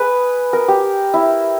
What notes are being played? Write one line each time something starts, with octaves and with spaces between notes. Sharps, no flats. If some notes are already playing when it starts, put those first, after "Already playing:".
Already playing: G#4 B4
A#4
G4
E4